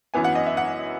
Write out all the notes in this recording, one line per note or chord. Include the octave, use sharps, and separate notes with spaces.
F#2 E3 B3 G#5
F#5
D#5
E5
F#5